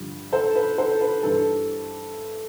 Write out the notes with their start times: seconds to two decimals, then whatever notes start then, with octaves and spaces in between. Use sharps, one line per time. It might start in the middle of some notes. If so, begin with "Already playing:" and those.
Already playing: G2 D3 F3
0.32 A4 C5
0.55 B4
0.78 A4 C5
1.01 B4
1.23 G2 E3 A4